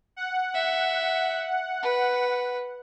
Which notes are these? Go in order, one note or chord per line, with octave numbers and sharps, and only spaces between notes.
F#5
E5
B4